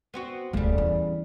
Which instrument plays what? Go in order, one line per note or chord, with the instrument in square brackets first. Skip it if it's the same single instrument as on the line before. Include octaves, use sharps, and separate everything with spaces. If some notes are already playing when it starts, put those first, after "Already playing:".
[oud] B3 C4 F#4
[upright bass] D1 A3 [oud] C#3 G3
[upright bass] E2 E3